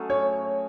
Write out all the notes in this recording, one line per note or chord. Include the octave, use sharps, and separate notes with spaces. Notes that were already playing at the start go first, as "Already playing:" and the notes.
Already playing: F#3 A3 C#4 G#4
C#5